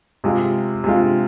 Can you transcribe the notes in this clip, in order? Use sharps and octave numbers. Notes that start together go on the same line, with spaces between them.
C3 G#3 F4
C3 G#3 F4